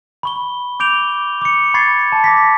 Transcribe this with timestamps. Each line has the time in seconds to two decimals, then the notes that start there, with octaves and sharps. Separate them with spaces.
0.23 B5 C#6 G7
0.80 D6 G6 D7 F7 G7
1.41 D6 C#7
1.74 B5 C#6 G#6 A6 C7
2.12 A5
2.24 D6 A#6 B6